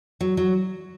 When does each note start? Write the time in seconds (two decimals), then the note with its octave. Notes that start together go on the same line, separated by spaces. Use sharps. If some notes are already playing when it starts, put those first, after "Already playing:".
0.21 F#3
0.37 F#3